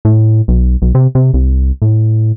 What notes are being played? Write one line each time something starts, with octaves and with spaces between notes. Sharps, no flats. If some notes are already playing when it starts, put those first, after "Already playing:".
A2
B1
B1
C3
C3
C2
A2